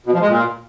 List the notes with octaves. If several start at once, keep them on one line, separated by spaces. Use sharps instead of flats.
B2
F3
G#3
A#2